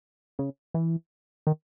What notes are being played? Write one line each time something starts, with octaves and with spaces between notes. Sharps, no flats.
C#3
E3
D#3